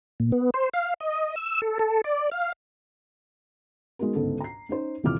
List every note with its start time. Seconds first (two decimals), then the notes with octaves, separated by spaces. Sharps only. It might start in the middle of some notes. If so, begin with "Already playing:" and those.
0.20 A#2
0.32 B3
0.54 C5
0.74 F5
1.00 D#5
1.36 E6
1.62 A4
1.79 A4
2.04 D5
2.31 F5
3.99 G#3 B3 D#4 F#4 A#4
4.15 G1 C#2 G#2 B3 A4
4.40 A#5 C7
4.69 C#4 D#4 C5
5.03 D#1 C3 E3 F4 D6 F6